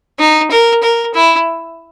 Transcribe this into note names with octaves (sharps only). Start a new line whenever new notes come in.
D#4
A#4
A#4
E4